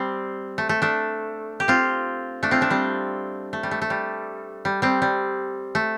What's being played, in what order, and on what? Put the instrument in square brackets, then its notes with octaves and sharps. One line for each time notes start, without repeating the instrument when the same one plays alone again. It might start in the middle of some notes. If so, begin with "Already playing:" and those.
Already playing: [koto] G3 C4
A3
A3
A3 D4
G4
C4 F4
A3 D4
C4 F4
A3 D4
G3 C4
A3
G3
A3
A3
G3
G3
G3 C4
G3
A3